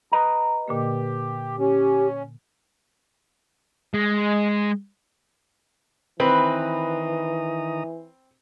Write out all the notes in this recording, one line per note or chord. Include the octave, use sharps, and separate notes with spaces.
B4 D#5 A#5
A#2 D3 A#3 G4
C#4 G4
G#3
D#3 E3 C4 B4 A#5 D#6